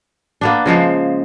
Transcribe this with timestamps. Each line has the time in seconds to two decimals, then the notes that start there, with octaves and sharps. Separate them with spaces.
0.41 A#3 B3 D4
0.66 C#3 F3 G#3 C5